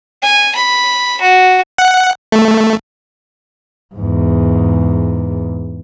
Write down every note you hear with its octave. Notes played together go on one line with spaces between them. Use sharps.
G#5
B5
F#4
F#5
A3
E2 G#2